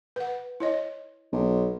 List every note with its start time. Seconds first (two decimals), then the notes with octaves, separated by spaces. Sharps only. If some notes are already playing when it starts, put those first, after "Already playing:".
0.16 B4 F#5
0.60 E4 C#5 D#5
1.32 B1